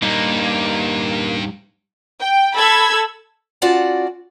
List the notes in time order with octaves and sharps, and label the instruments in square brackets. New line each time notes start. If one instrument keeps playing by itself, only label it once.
[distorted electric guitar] G2 [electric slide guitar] G3 D#4 [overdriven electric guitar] A#3
[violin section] G5
A4 B5 E6 G#6
[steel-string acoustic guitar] C#4 F4 F#4 D5 A5